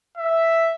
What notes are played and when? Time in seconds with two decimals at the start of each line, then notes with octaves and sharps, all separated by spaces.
0.17 E5